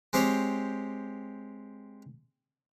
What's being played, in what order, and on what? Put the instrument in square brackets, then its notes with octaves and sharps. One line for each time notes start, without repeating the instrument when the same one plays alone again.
[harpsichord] G#3 C4 G4 C5 C#5